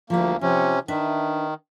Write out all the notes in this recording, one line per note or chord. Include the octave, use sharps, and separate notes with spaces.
D2 F3 G3 A#3 E4
C3 F3 C#4
D#3 D4 B4 E5